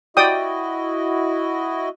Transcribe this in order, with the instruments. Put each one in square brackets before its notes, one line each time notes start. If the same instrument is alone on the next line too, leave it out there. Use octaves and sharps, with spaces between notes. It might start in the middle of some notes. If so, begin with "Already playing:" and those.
[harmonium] E4 F#4 D#5 [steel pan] D5 G5 D#6